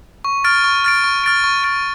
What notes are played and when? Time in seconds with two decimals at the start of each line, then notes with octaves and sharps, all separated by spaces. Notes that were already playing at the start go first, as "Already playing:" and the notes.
0.25 C#6
0.44 F6 A6 D7
0.64 C#6
0.84 F6 A6 D7
1.04 C#6
1.24 F6 A6 D7
1.44 C#6
1.64 F6 A6 D7